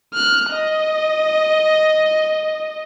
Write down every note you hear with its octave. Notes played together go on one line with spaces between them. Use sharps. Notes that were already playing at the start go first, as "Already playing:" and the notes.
F6 F#6
D#5